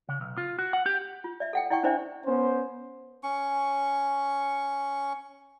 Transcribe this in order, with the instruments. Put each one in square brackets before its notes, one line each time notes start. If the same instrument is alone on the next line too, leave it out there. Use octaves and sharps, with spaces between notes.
[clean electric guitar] C#3
B1
F4
F#4
F#5
G4
[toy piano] F4
D5 E5
A4 F#5 G5
E4 D5 F#5 G5 C#6
C#4 D4 E4 C5 D5 E5
[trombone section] B3 C#4 C5
[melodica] C#4 C#6